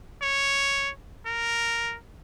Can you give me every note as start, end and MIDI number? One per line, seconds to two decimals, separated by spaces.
0.22 0.90 73
1.26 1.96 70